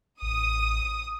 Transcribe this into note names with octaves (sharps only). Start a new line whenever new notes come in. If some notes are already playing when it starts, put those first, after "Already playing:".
A1 D#6